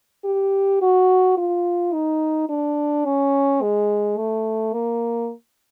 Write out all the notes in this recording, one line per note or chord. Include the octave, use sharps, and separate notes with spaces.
G4
F#4
F4
D#4
D4
C#4
G#3
A3
A#3